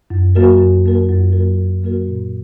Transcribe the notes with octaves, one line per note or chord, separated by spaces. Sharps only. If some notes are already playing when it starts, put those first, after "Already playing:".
F#2
F#3 A#3 F#4 A#4
F#2
F#3 A#3 F#4 A#4
F#2
F#3 A#3 F#4 A#4
F#2
F#3 A#3 F#4 A#4
A#2